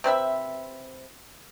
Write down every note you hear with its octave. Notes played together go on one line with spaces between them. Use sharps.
C3 C4 B4 E5